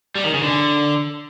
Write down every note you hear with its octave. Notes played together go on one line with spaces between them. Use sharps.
G3
D#3
C#3
D3